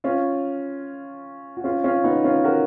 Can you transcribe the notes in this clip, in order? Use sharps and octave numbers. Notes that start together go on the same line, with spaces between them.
C#4 F4
F#4
C#4 F4
C#4 F4
B3 D#4
C#4 F4
F#4 A#4